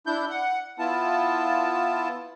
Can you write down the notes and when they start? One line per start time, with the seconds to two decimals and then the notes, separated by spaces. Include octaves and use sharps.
0.06 D4 E4 G6
0.29 F#5
0.79 B3 E4 F4 A5